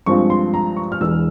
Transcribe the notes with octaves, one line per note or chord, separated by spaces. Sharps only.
G2 F3 G#3 C4 F4 C#6
C6
A#5
C#6
F6
E1 E2 E3 E6